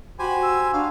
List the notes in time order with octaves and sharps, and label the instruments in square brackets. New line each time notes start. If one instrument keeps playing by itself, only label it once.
[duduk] F#4 [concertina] G4 C5 G#5 [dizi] B5
[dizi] E6
[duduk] D4 [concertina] F#4 [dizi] F5